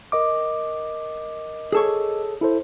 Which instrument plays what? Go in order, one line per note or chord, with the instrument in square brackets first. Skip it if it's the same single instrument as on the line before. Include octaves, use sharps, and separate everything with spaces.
[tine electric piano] A#4 D#5 D6
[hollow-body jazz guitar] G#4 A4 C#5
[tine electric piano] E4 A4 C5